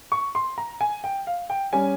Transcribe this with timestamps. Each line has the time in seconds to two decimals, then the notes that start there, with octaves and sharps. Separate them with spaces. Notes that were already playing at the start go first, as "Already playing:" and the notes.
0.12 C#6
0.35 C6
0.58 A#5
0.81 G#5
1.04 G5
1.27 F5
1.50 G5
1.73 G3 C#4 G#5